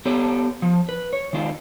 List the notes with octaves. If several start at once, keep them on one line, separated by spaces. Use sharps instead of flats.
B3 D4 G4 A4 C#5
F3
B4
C#5
D#3 G#3 D4 F4